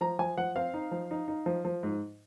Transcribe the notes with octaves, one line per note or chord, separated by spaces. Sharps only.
F3 A#5
F3 G#5
F3 F#5
C4 F5
D#4
F3
D#4
D#4
F3
F3
G#2